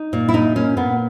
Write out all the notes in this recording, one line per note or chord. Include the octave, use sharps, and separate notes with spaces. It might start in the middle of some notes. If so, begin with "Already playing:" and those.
Already playing: D#4
A#2
E4
A#2 D#4
A#2 C#4
A#2 B3